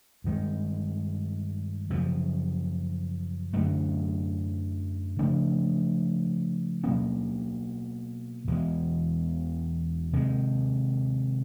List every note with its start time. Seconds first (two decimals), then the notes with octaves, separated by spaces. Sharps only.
0.24 G2 D#3 G#3
1.90 F#2 C#3 F3
3.53 F#2 D3 F#3 A3
5.19 C#3 F3 A3 D4
6.84 B2 F#3 A#3 C#4
8.47 E2 B2 G#3
10.13 C3 D#3 G#3